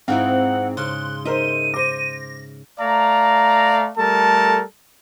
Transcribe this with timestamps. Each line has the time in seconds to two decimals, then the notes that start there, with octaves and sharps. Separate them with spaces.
0.08 G#2 C4 D#4 E4 C5 F5 F#5
0.77 C#3 C6 F#6
1.25 D#4 A#4 C5 E5 D#7
1.74 C5 D6 A#6
2.80 A3 D5 F5 A#5
3.98 G3 A3 A4 A#4 A5